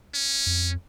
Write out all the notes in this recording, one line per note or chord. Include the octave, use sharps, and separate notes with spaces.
C#4
F2